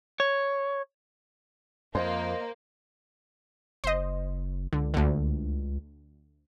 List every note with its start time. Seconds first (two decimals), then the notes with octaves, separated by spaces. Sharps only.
0.20 C#5
1.95 F2 A#3 C5 D#5
3.84 F#1 C5 D#5
4.73 C#2 D3
4.94 D2 D3